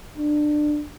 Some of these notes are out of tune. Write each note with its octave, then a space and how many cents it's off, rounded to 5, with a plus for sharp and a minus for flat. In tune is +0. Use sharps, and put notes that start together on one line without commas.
D4 +20